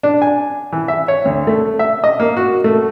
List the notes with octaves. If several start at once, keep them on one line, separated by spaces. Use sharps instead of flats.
D4
G#5
E3
E5
C#5
D2
A3
E5
D#5
A#3
F#4
A3